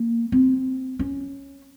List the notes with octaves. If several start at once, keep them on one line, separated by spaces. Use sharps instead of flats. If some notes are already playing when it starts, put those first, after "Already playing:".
Already playing: A#3
C4
C#4